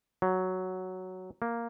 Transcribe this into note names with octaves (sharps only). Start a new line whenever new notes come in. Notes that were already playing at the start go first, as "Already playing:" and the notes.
F#3
A#3